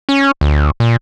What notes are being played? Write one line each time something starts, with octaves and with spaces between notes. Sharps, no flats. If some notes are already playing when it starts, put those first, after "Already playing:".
C#4
D2
A#2